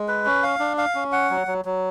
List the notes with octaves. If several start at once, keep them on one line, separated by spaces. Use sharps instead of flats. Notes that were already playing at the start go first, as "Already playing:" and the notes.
Already playing: G#3
B4
C#4
F5
D4
F5
C#4
F#5
F#3
F#3
F#3